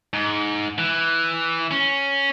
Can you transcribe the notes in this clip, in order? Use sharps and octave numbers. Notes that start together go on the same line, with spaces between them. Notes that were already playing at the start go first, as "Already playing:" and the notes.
G#2
E3
C#4